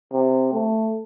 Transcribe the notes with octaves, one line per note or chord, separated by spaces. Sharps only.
C3
A3